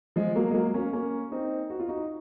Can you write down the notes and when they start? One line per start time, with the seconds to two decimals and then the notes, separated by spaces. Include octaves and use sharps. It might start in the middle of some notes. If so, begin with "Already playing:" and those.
0.16 F3 G#3
0.35 F#3 A#3
0.50 G#3
0.54 F#3 A#3
0.74 A#3 C#4
0.93 A#3 C#4
1.32 C4 D#4
1.70 F#4
1.80 F4
1.89 D#4 F#4